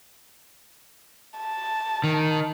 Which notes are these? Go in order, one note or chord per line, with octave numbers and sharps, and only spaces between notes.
A5
D#3